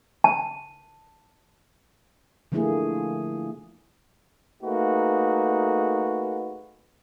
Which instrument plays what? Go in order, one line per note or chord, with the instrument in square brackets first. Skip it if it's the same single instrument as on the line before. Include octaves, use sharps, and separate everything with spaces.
[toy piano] A5
[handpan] D3 F3 A3 A#3 E4 G#4
[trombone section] A3 A#3 D#4 F#4 G#4 B4